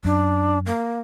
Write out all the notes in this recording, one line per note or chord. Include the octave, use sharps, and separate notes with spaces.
F#2 D4
A#3